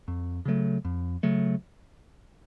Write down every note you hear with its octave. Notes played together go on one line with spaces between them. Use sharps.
F2
C#3 F#3 A3
F2
C#3 F#3 A3